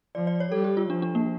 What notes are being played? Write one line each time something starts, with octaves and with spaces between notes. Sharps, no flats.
F3 D5
D5
C#5
G3 A4
G4
F4
F3 D4
D4
A#3